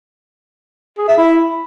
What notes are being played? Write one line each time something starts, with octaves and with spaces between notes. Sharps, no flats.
G#4
E5
E4